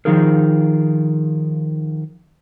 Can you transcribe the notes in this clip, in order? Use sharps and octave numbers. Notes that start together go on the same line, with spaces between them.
D#3 F3 D#4 F4 G#4 A#4